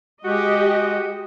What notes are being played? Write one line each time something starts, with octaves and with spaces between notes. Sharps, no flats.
G#3 F#4 G4 D#5